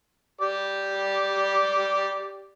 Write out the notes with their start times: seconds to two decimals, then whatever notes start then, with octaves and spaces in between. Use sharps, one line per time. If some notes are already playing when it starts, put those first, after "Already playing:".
0.41 G4 D5